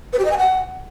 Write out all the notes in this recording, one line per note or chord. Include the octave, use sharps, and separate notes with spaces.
B4
G4
D#5
G#5
F#5